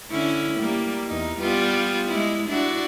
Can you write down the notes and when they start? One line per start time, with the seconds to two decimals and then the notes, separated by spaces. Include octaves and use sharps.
0.11 D3 C#4 E4
0.58 G3 A#3
1.07 E2 D#4
1.40 G3 B3 F4
2.10 G#3 E4
2.47 D4 E4 F#4